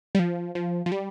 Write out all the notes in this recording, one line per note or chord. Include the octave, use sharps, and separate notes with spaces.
G3
F3
F3
F3
G3